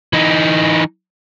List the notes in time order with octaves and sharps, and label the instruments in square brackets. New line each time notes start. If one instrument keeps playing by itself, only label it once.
[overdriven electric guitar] E3 D#4